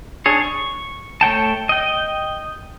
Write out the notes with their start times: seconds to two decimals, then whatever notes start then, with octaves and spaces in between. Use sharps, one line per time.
0.26 D4 G#4 C#5
0.42 C#6
1.21 A3 C#5 G5 A5
1.69 D#5 G5